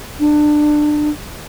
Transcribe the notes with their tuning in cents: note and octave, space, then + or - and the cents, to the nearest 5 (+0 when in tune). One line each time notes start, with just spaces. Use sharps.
D4 +25